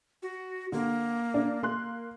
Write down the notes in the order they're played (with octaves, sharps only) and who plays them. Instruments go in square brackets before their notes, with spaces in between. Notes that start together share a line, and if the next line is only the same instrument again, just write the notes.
[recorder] F#4
[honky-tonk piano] D3 [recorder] A#3
[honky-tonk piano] D4
A#3 C6 F#6